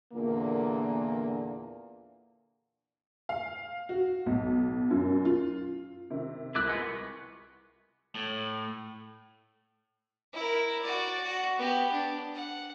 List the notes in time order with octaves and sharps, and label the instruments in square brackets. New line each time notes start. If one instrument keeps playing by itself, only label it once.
[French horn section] E2 A#2 D3 A#3
[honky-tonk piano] F5
F#4
B1
F#2
F4
C3 D#3
[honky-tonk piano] C2 [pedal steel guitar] E4 D6 F#6
[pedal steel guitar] G#3 B3 F4
C#6
[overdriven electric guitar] A2
[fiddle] E4 A#4
F#4 D5
F#4
B3 G4
D4
F#5